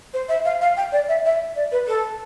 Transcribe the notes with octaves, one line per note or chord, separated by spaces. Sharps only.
C5
E5
F5
F5
G5
D5
E5
E5
D5
B4
A4